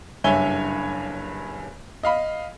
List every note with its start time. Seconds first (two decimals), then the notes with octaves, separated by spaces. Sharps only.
0.24 F#1 G2 C#5 E5 G#5 G7
2.03 D#5 F5 B5